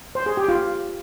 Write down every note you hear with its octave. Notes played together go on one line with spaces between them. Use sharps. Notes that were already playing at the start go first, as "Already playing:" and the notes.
C5
G#4
G4
F4